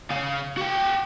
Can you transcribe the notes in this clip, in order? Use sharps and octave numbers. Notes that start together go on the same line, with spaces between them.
C#3 F5
F#4 G5